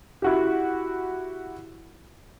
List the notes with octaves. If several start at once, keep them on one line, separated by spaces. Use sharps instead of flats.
E4 F#4 G4